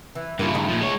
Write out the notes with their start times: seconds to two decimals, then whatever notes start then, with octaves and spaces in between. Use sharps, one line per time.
0.15 E3
0.39 G2 C#3 A#3 E4 F4
0.54 D2 A3 D#4
0.68 A#2 F3
0.81 G#3 C#5